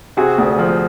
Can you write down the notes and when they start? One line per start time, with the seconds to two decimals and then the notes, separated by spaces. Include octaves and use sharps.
0.17 C3 F#4 G#4
0.38 D2
0.59 F3